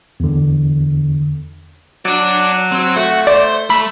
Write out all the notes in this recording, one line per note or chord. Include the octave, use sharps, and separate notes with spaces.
E2 D3
F#3 D4 D5
C4
A3 F#4
C5 D5
A3 B5